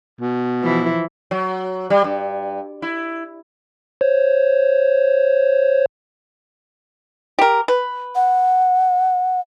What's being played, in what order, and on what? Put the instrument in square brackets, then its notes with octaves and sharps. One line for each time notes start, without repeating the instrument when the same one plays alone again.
[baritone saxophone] B2
[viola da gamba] E3 F3 E4
[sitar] F#3
G3
G2
E4
[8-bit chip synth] C5 C#5
[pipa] G4 A#4
B4
[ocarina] F#5